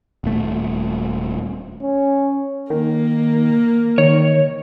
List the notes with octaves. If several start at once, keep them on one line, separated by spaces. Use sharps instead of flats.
D#1 A3
C#4
D#3 A#3
D#3 C#5